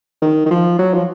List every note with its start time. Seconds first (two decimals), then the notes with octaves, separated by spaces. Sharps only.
0.22 D#3
0.46 D#3
0.51 F3
0.79 F#3
0.94 F3